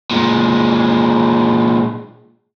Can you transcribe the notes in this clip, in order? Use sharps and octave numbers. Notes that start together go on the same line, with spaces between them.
A#2 G#3